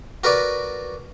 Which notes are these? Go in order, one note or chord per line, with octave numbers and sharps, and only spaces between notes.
F#4 A#4 B4 D5